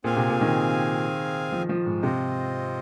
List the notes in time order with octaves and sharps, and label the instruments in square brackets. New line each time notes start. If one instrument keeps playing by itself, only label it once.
[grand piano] A#2 [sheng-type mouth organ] C4 G#4 F5 G#5
[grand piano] C3
A#2
D#3
F3
F3
G#2
[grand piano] C3 [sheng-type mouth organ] C4 F4 C5 D#5